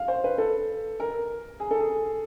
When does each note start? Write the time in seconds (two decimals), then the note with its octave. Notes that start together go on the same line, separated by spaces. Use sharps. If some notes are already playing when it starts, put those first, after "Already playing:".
Already playing: F5
0.08 C5
0.24 B4
0.38 A4
1.00 A#4
1.60 G#4
1.71 A4
1.80 G#4